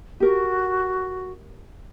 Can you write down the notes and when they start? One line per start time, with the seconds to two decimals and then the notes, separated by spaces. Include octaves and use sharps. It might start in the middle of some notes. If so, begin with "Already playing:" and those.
0.20 F#4 G4 A#4